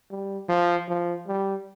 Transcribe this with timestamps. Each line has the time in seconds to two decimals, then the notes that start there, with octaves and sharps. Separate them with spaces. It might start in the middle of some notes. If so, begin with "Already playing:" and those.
0.11 G3
0.49 F3
0.89 F3
1.28 G3